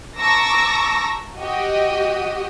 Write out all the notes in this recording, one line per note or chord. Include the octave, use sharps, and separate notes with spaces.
A5 A#5 C#6 D6 E6 A#6
F#4 G4 D#5